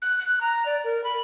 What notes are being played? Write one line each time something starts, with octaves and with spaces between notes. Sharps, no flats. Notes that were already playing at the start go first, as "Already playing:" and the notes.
F#6
F#6
A#5
D5
A#4
B5